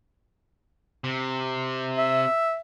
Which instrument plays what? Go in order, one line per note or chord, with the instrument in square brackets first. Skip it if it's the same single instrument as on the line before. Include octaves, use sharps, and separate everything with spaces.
[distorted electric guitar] C3
[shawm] E5